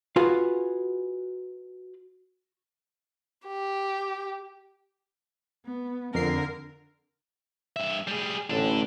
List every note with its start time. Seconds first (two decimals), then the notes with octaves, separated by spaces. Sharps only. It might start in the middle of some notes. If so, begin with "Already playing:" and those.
0.16 F4 F#4 G#4 B4 F5
3.47 G4
5.65 B3
6.15 F2 D3 A#4 C7
7.76 G2 E5
8.07 G3 G#4
8.50 A1 D4 A4